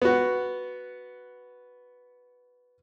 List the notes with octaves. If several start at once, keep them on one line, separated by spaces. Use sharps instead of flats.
B3 F#4